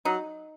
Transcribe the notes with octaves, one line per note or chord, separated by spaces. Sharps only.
F#3 D#4